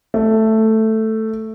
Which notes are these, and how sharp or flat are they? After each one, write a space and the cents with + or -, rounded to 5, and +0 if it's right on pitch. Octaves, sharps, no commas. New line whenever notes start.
A3 +5